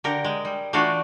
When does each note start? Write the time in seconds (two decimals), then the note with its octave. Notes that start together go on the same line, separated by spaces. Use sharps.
0.04 D3 G4 A#4
0.24 G#3
0.45 G3
0.73 E3 A3 D4 F4 F#4